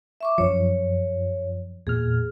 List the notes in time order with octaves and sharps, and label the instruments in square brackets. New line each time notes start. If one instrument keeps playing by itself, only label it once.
[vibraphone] E5 C#6 D6
[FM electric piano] F#2 F3 [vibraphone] C#5
[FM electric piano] E2 A#2 F6 [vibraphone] G#4